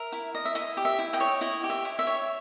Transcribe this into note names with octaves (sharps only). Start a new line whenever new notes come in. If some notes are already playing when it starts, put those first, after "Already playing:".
Already playing: A#4 E5
E4
D#5
E5
E4 D#5
G4
E5
E4
D#5 G5
C#5
E4 D#5
G4
E5
E4
E5
C#5